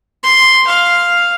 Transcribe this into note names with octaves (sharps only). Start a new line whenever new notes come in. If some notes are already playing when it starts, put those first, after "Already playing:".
C6
F5